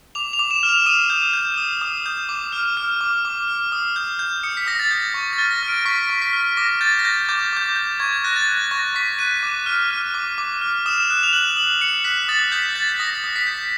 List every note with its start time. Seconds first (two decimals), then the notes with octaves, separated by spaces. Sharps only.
0.15 D6 F7
0.33 F7
0.39 D6
0.51 E7
0.63 F6
0.69 F7
0.86 D#6 D#7
1.10 G6
1.33 G6
1.57 D#6
1.82 D#6
2.06 G6
2.29 D6
2.52 F6
2.77 F6
3.01 D6
3.25 D6
3.48 F6
3.72 D#6
3.96 G6
4.19 G6
4.43 D#6 C#7
4.57 B6
4.66 D#6 A#6
4.79 A6
4.91 G6
5.14 C#6
5.33 A6
5.38 F6
5.51 A#6
5.63 F6
5.68 D7
5.85 C#6 B6
6.10 C#6
6.22 B6
6.33 F6
6.57 D6 A#6
6.81 G6 A6
6.99 A#6
7.05 G6 A6
7.29 D6 G6
7.53 D6 G6
7.76 G6
7.99 C#6 G#6
8.24 F#6 A#6
8.36 A6
8.48 F#6
8.71 C#6 A#6
8.95 C#6 B6
9.19 F#6 D#7
9.43 D6
9.66 F6
9.91 F6
10.14 D6
10.38 D6
10.61 F6
10.86 D#6 E7
11.10 F#6
11.23 F7
11.33 F#6 F#7
11.56 D#6 F#7
11.81 D#6 C#7
12.04 F#6 B6
12.28 D#6 A6
12.52 G6 B6
12.75 G6 A6
12.89 B6
13.00 D#6 A#6
13.24 D#6
13.36 B6
13.47 G6